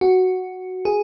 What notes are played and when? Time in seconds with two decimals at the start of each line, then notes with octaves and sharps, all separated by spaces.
0.01 F#4
0.85 G#4